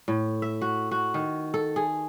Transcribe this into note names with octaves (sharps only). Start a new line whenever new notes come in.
A2
E5
F#4
F#4
D#3
A4
G#4